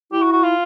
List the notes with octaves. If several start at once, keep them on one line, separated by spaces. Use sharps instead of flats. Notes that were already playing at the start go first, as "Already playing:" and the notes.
E4 G4
F#4
F#4
F4